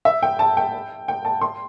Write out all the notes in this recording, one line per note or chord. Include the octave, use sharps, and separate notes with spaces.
E5
G5
A5
G5
G5
A5
C6